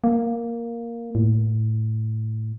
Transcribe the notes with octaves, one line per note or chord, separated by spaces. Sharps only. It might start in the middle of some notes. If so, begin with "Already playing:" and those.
A#3
A2